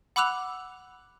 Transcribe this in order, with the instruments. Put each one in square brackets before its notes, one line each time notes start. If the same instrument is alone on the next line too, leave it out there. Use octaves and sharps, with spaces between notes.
[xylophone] F#5 B5 D6 E6 F#6 F7